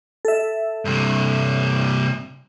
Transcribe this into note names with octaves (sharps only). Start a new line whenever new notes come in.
A4 E5
G2 C3